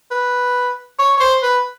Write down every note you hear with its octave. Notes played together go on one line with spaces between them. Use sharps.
B4
C#5
C#5
C5
B4